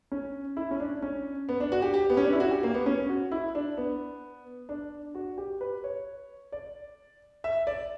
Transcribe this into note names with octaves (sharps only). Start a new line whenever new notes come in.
C#4
E4
C#4
D4
C#4
B3
D4
F#4
G4
G4
B3
C#4
D4
E4
F#4
G4
A#3
B3
C#4
F#4
E4
D4
B3
D4
F#4
G4
B4
C#5
D5
E5
D5